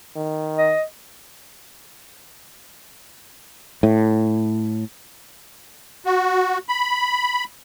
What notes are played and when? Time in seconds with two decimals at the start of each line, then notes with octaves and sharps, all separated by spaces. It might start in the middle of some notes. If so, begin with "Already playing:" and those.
0.16 D#3
0.57 D#5
3.83 A2
6.04 F#4
6.69 B5